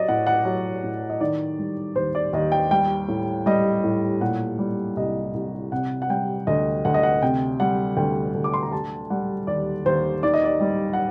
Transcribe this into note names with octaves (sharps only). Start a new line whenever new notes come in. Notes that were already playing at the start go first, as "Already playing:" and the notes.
Already playing: F#3 D5 D#5
A2 F#5
F#5
F#3
A2
D#5
D#3 D5
G3
D#2 C5
D5
D#2 D#5
G5
G3 G5
A2
G3 D#5
A2
A#2 F#5
G3
C2 D#5
C2
C3 F#5
F#5
G3 G5
D2 D#5
D2 F#5
D#5
F#5
C3 G5
G3 F#5
D2 G5
D2
D6
C6
A#5
D3 A5
G3 F#5
D#2 D5
D#2 C5
D#3 D5
D#5
D5
G3
F#5